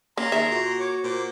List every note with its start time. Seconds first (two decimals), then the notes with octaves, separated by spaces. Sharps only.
0.17 A#3 C#4 A#5 C6
0.32 D#3 G#4 E5
0.51 A#2 F#4
0.79 C#5 C#6 D6
1.04 A#2 C5 D6